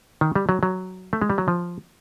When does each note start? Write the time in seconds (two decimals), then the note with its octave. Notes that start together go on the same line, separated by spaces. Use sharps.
0.21 D#3
0.35 G3
0.49 F#3
0.63 F#3
1.13 A3
1.22 G#3
1.30 G3
1.38 F#3
1.48 F3